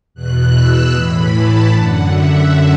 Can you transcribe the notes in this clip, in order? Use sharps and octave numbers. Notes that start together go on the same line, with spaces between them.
E2 B2 F#6
E6
A2 E3 B5
A5
F#2 D3 F#5
E5